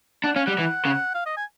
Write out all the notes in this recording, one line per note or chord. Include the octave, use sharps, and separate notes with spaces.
D4 F#5
C#4 F5
G3 F#5
E3
C#3
F5
D#5
G#5